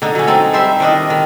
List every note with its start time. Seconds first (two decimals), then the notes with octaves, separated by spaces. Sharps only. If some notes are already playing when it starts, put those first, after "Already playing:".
0.02 D3 D#4
0.15 F#3 C#4
0.27 C4 D#4 A4
0.53 G3 C5 E5
0.80 D#3 D4 D#5
1.10 D#3